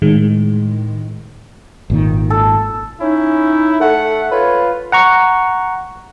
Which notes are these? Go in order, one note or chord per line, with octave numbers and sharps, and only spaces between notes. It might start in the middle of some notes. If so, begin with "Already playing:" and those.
A2 D#3 G#3
G#1 A#2 D#3
A4
C#4 D#4 E4
A3 A4 F#5
F4 B4 C#5
F#5 A#5 C#6